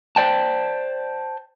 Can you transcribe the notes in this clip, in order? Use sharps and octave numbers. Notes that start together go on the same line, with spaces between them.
C5 D5 G5 A5